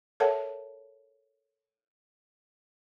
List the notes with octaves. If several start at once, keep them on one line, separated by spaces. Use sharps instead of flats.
A4 A#4 C#5 E5 F#5 A5